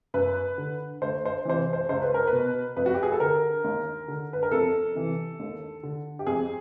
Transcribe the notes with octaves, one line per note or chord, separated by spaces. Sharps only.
F#2 B4
D3
D2 C5
C5
C3 E3 C5
C5
C#2 C5
B4
A#4
B4
B2
F2 B4
F#4
G4
G#4
A4
D3 A#4
D#2
D3
B4
A#4
F2 A4
C3 E3
D#2
D3
G4
F2 G#4